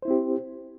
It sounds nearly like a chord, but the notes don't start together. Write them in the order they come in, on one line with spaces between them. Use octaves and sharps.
C5 E4 C4 G4